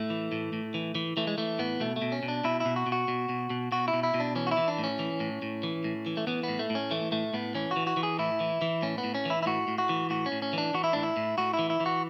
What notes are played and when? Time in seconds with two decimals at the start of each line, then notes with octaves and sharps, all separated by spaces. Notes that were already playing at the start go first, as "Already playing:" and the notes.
Already playing: A2 A3
0.10 E3
0.32 A2
0.53 A2
0.74 E3
0.95 E3
1.17 E3 A3
1.27 G#3
1.38 E3 A3
1.59 A2 B3
1.80 B2 A3
1.96 A3
2.02 B2
2.12 C#4
2.23 B2
2.28 D4
2.44 B2 E4
2.60 E4
2.65 B2
2.76 F#4
2.86 B2
2.92 F#4
3.08 B2
3.29 B2
3.50 B2
3.72 B2 F#4
3.88 E4
3.93 B2
4.03 E4
4.14 B2
4.20 D4
4.36 E3 C#4
4.47 F#4
4.51 E4
4.57 E3
4.68 D4
4.79 A2
4.84 C#4
4.99 E3
5.20 A2
5.42 A2
5.63 E3
5.84 A2
6.06 E3
6.17 A3
6.27 E3 B3
6.43 A2 B3
6.59 A3
6.70 A2
6.75 C#4
6.91 E3 A3
7.12 A2 A3
7.33 A2 B3
7.55 E3 C#4
7.71 F#4
7.76 E3
7.87 F#4
7.97 E3
8.03 G#4
8.19 A2 E4
8.40 E3
8.62 E3
8.82 A2 C#4
8.98 B3
9.04 A2
9.15 C#4
9.25 E3 E4
9.43 E4
9.46 A2 F#4
9.68 A2
9.78 F#4
9.89 E3
10.10 A2 F#4
10.26 C#4
10.32 A2
10.42 C#4
10.53 E3 D4
10.74 E3 F#4
10.84 E4
10.93 A2 D4
11.03 E4
11.17 A2
11.38 A2 F#4
11.54 E4
11.59 E3
11.70 E4
11.80 E3
11.86 F#4